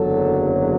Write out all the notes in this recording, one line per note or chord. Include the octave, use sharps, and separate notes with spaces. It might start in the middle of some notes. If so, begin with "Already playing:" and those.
Already playing: F#1 E2 D3 F#3 A4